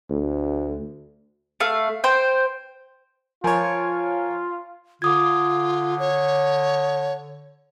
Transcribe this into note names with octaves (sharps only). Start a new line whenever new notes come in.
D2
A3 F5
C5 G5
F3 F4 A#4 C#5 G#5
D3 F4 D6 D#6 G#6
C#5